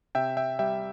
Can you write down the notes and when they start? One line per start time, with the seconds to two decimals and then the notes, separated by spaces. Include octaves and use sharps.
0.15 C3 E5 G5
0.37 E5 G5
0.59 G3 E5 G5